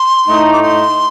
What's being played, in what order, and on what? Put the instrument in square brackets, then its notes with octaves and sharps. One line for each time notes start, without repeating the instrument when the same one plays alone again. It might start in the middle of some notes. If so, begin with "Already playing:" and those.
Already playing: [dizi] C6
[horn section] A2 A3 D#4
[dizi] D6
C6